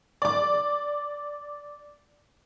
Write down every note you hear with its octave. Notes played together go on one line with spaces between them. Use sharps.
D5 D6